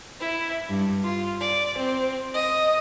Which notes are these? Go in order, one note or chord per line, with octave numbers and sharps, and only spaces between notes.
E4
G2
F4
D5
C4
D#5